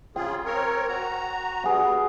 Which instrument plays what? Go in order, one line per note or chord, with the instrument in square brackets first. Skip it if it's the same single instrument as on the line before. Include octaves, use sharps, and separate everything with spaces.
[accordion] C#3 F4 G#4 [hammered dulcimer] G5
[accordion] C4 A#4 C#5
F#4 A#5
[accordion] G3 B3 [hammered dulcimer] F#4 G#4